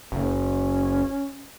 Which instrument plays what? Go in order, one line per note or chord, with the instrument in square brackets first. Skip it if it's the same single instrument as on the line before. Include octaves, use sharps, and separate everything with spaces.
[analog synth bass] F#1 [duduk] C#4